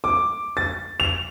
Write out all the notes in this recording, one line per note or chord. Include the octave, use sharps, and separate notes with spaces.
D6
A6
F7